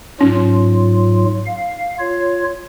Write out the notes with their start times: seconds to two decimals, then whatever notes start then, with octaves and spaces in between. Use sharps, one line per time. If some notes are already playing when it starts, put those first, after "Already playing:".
0.21 G#2 F#3 C#4 F4
1.46 F5
1.99 F4 C#5